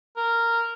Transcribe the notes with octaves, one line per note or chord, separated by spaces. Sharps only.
A#4